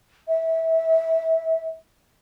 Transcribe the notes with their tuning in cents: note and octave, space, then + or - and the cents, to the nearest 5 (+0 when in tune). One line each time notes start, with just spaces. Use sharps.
E5 -20